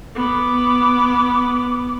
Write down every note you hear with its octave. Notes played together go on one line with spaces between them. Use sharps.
B3 D6